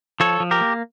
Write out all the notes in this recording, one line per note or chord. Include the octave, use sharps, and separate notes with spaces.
F3 A4 C#5
F3
G4 A#4
A#3